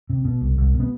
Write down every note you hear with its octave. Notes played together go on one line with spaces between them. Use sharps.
C3
B2
C2
C2
B2
B3